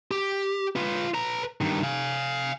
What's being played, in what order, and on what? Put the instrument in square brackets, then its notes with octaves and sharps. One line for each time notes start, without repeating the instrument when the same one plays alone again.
[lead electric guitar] G4
F4 B4
B4 A#5
G2 D#3
F5 G#5